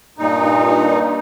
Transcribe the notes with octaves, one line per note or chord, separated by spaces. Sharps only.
G2 A#2 D#4